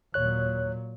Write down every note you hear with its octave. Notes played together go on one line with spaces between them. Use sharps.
D#2 A#2 F#3 C#5 F#6